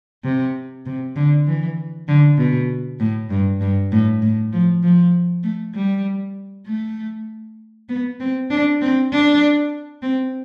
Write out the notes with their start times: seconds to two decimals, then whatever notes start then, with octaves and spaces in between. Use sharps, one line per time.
0.24 C3
0.86 C3
1.16 D3
1.47 E3
2.08 D3
2.38 B2
3.00 A2
3.30 G2
3.61 G2
3.92 A2
4.22 A2
4.53 F3
4.83 F3
5.44 A3
5.75 G3
6.67 A3
7.89 B3
8.20 C4
8.51 D4
8.81 C4
9.12 D4
10.03 C4